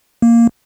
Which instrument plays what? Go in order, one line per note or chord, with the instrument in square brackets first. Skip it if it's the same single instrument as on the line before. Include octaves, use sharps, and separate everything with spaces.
[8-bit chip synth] A#3